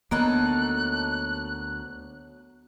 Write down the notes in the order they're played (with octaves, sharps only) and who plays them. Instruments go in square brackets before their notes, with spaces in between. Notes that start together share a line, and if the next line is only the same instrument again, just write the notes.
[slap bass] D2 A#3 [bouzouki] F#3 D#4 A4 [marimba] B3 [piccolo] F#6